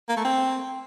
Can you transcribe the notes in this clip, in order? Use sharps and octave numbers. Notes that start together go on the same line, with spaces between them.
A#3
A3
C4